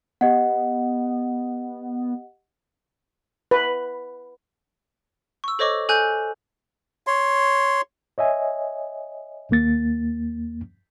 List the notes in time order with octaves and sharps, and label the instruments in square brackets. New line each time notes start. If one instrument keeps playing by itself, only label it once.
[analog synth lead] B3 [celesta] G4 D#5 F#5
[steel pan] B4
[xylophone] C#6 E6
A4 C5 C#5 D#5 C#6 D6
A4 G#5 F#6 G6
[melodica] C#5 C6
[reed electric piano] C#5 D#5 E5 G#5
D#2 A#3 A6